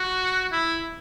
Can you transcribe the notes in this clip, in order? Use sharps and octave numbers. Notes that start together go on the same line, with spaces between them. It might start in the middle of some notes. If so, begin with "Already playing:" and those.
Already playing: F#4
E4